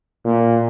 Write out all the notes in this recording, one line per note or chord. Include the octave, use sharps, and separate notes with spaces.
A#2